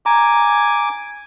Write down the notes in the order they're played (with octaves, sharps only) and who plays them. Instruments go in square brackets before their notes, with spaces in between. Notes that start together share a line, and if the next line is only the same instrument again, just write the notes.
[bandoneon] G#5 D6 [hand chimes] A#5